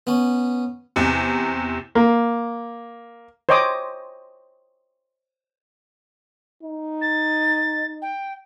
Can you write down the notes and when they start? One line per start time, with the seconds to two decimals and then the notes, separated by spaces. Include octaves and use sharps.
0.07 B3 C#4
0.96 E2 C3
1.95 A#3
3.49 C5 C#5 D#5 G5 D6 D#6
6.63 D#4
7.01 A6
8.01 G5